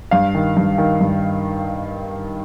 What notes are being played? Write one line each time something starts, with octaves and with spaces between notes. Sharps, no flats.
G2 F5
D#3
G2
D#3
G2